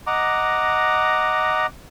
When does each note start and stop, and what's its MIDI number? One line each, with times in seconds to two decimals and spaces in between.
0.07 1.66 75
0.07 1.66 78
0.07 1.66 82
0.07 1.66 86